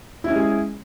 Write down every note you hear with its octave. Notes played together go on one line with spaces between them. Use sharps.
G#3 C#4 E4 G#4